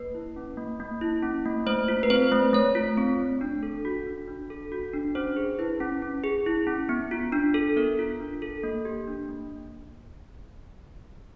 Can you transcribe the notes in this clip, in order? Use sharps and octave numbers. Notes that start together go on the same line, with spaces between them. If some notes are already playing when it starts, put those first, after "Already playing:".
Already playing: A#3 B4
E4
C#4
A#3
A#3
E4
C#4
A#3
A3 C5
F4
B4
C4 C5
A3
A3 C#5
F4
C4
A3
D4
A4
F#4
D4
D4
A4
F#4
D4
C#4 C5
G#4
E4 B4
C#4
C#4
G#4
E4
C#4
B3
F4
D4
A4
B3 A#4
F4
D4
A4
A#3
G4
D4
A#3